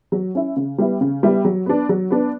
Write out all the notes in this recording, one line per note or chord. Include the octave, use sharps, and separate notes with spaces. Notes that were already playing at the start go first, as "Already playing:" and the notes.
F#3
C#4 E4
C#3
G3 B3 E4
C#3
G3 B3 E4
F#3
B3 D4
F#3
B3 D4